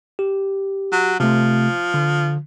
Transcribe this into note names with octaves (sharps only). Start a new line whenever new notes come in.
G4
F#3
C3 F3 A3
D3